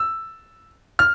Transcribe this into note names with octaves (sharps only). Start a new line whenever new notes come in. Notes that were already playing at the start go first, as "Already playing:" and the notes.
Already playing: E6
F6